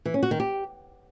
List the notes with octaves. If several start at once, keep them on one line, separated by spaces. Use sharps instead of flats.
E3
C#4
F#4
D#3
G4